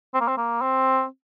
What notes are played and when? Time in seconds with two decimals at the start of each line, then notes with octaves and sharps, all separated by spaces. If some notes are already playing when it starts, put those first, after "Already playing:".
0.14 C4
0.21 A#3
0.28 C4
0.38 A#3
0.62 C4